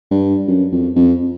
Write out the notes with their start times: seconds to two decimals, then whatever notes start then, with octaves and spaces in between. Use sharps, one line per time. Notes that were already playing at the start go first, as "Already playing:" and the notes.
0.11 G2
0.48 F#2
0.72 F2
0.96 F2